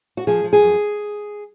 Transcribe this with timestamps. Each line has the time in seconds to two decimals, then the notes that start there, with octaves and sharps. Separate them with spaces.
0.17 F#4
0.27 F3 G#4
0.44 F3
0.53 G#4
0.61 F#2